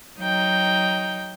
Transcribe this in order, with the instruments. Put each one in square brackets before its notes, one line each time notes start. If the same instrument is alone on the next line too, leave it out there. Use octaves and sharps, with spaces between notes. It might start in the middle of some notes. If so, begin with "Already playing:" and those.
[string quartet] F#3 D#4 G5